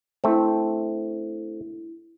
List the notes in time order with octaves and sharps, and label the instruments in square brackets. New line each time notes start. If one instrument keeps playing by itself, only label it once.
[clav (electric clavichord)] A3 C4 [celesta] D4 E4